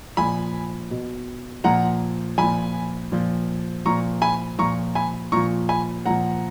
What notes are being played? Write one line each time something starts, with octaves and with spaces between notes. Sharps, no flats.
A#2 F3 G#5 B5
B2
A#2 F3 F#5 A#5
A#2 F3 G#5 B5
A#2 F3
A#2 F3 A#5 C#6
G#5 B5
A#2 F3 A#5 C#6
G#5 B5
A#2 F3 A#5 C#6
G#5 B5
A#2 F3 F#5 A#5